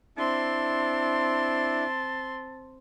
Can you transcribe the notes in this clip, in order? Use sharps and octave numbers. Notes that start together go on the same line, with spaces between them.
C4 D4 E4 A5 C6